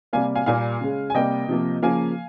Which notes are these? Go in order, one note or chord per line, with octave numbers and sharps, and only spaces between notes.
C3 G3 A#3 F5 G#5
F5 G#5
A#2 G3 A#3 F5 G#5
C#3 G#3
G#5
C3 G3 A#3 D#5 G5
C3 F3 A#3
C#3 F3 A#3 F5 G#5